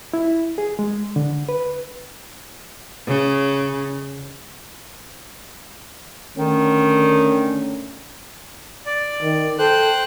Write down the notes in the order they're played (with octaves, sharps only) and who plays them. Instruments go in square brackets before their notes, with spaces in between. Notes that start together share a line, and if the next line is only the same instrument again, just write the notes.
[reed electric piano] E4
G#4
G#3
D3
B4
[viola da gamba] C#3
[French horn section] D3 A3 C#4 [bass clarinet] D#3
[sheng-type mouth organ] D5
[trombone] D#3
[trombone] A4 [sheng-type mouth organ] C5 G5 F#6